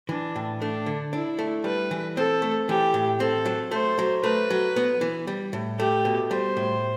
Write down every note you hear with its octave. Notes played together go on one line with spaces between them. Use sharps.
E3 D4
A2
A3 D4
D3
D4 E4
A3
G3 B4
E3
C4 A4
A3
E3 G4
A2
C4 A4
F#3
A3 C5
F#3
A3 B4
F#3
B3
E3
G3
A2
A3 G4
B2
G3 C5
A2